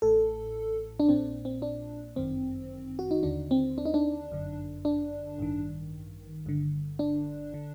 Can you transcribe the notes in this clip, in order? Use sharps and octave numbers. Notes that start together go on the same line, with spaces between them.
A1 A2 A4
D4
A#1 A#2 C4
C4
D4
G1 F#2 D#3 C4
F#4
D#4
D#2 D3 D4
C4
D4
D#4
D4
G1 F#2 D3
D4
A1 G2 D#3
G1 G2 D3
D4
D3